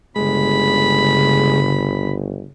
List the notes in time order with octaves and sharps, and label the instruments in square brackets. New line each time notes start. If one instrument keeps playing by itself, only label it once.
[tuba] G1 [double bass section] C#3 [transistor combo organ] G#3 [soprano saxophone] B5